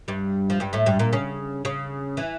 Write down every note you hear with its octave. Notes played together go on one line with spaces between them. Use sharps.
G2 G3
F3
G2 G3
A2 A3
G2 G3
A#2 A#3
C#3 C#4
C#3 C#4
E3